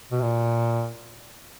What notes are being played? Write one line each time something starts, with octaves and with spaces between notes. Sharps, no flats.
B2
A#2